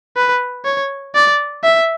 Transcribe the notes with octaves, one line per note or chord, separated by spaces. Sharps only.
B4
C#5
D5
E5